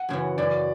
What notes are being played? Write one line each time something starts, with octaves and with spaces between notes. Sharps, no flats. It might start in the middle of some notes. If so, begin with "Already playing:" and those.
Already playing: F#5
F#2 C#3 E3
F#2 C#3 E3 D5